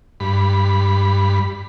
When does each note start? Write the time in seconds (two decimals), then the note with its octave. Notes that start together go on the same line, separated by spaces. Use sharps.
0.20 G2 B5